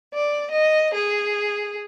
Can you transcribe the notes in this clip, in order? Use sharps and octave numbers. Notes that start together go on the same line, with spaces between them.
D5
D#5
G#4